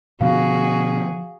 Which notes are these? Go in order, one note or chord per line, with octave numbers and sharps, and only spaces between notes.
B2 D3 F3 B3 F#4 G#4 F5